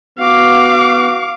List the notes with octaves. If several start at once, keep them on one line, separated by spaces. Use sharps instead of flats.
B3 F#4 F5 D6